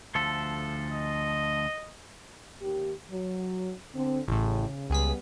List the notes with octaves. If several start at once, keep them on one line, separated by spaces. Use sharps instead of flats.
D2 F3 A4
D#5
D#2 G4
F#3
D3 C4
A1 A2 C#3
C#2 G3 B3 G#4 B6